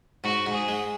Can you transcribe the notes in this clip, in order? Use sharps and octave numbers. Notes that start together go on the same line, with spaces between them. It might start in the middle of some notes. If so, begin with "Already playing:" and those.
G#2 F#4
G#2
G#4
G#3